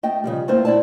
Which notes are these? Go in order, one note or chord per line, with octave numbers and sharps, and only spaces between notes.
A3 D#5 G5
C#3 F3 G3
A3 A#3 C4 E4 C5
E4 D5 A5